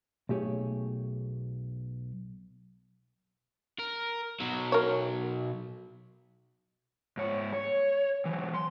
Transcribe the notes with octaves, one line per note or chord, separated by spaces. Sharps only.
B1 A3 G4 G#4 C#5
A#4
B2 F#3
A#4 C#5
G#2 C#5
C#5
E3 F#3
C6